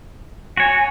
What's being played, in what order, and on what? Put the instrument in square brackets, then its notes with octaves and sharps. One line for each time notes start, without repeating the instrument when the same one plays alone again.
[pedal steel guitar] F#4 C#5 [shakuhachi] G#5